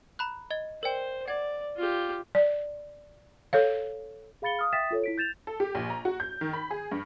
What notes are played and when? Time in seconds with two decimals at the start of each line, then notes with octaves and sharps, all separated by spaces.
0.19 A#5 B5 F#6
0.51 D#5 G#6 G7
0.83 A#4 C5 D5 G5
1.28 D5 F#5 G#6
1.77 F4 G4
2.35 D5
3.53 A4 C#5 F5
4.42 G#4 F5 B5 A6 C#7 G7
4.59 F5 D#6 F6
4.73 E5 G5 D#6 A6 B6 E7
4.91 F4 A4 C#5
5.04 E4 B6 D7
5.18 G6 A6 E7 F7
5.47 A4
5.60 G4
5.75 A#1
5.90 A#5
6.05 F#4
6.20 G6
6.41 D#3
6.53 B5
6.71 G#4
6.92 G2